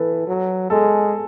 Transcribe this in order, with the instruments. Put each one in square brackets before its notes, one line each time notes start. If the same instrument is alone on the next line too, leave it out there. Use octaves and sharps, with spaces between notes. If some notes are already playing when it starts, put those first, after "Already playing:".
Already playing: [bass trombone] E3 [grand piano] A4 B4
[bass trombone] F#3
[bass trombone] G#3 [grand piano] A4